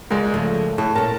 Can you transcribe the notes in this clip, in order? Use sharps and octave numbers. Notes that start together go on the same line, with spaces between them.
C#2 G#3 A#4 D5
C#3 F3 A3
A2 A4
A#2 C#4 A#4 A5